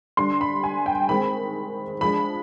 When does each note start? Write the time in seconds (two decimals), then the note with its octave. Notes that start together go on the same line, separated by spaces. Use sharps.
0.17 D3 G3 D4 C6
0.41 B5
0.64 G#5
0.86 G5
1.09 D#3 G#3 C4 B5
2.01 F3 G#3 D4 B5